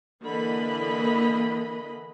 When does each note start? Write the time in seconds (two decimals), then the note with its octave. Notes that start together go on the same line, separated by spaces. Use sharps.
0.24 D3 E3 A#3 D#5 B5